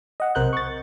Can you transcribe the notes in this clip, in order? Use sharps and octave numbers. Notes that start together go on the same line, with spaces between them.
D#5 F#5
B1 C3 A#4 C5 F#6 G6
C#6 A6